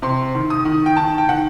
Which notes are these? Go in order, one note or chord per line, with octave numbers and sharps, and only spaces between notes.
C3 C6
D#3
D#6
D#3
G5
D#3 A5
G5
D#3 F#5